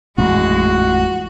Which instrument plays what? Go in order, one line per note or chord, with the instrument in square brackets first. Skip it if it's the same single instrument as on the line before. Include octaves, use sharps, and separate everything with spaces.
[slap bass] A1 F2 A#2 [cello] G#3 [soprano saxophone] F#4